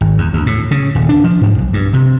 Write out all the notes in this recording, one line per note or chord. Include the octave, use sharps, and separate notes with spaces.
G#1
E2
D2
A2
C#3
D#1
D4
F3
G#2
B1
G2
C3